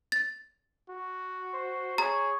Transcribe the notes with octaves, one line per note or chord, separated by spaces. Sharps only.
A6
F#4
C5
G#4 C#5 A#5